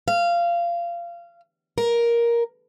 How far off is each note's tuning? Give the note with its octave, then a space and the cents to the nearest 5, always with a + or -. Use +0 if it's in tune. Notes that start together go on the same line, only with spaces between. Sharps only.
F5 -20
A#4 +10